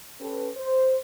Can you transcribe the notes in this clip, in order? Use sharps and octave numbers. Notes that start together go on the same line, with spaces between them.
C#4 G4 A4 B4
C5